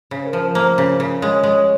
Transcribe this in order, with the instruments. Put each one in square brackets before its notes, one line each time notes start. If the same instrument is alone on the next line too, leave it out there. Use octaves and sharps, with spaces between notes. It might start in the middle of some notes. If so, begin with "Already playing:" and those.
[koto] C#3
[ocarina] C5
A#4
[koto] F3
[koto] A#3 [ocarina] C5
[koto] C#3
C#3
[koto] G#3 [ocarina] C#5
[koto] G#3